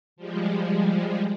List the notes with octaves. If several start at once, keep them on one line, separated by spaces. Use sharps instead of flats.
F3 G3 G#3